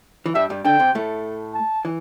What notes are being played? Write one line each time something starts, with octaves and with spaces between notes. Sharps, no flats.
E3
G2 G3 E5
G2 G3
D3 D4 G5
C3 C4
A2 A3
A5
E3